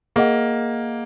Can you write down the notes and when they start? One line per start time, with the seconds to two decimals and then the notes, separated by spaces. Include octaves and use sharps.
0.16 A#3 G#4 D#5 F#5